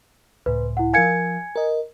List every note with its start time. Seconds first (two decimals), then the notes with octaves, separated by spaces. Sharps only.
0.46 C#2 A2 B4
0.77 E4 F#5
0.94 F3 A#4 F5 G#5 G#6 C#7
1.56 A#4 D#5